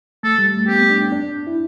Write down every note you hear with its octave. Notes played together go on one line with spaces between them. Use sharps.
A3 A4
G3
A3
B3 G4
C4
D4
D4
D4
E4